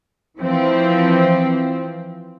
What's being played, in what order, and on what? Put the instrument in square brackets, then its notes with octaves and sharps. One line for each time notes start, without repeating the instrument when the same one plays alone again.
[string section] E3 F3 C4